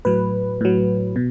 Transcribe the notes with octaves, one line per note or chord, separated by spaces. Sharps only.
A2 F#3 B4
A2 F#3
B2